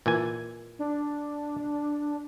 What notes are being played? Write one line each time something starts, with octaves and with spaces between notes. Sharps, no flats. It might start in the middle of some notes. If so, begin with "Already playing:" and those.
A#2 E3 G#5
D4